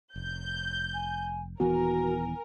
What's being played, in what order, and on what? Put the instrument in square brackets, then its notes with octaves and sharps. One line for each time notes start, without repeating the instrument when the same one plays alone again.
[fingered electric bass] F1 [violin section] G6
[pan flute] G#5
[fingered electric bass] D#1 E3 B3 [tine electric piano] F#4 [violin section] A#4 [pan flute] G#5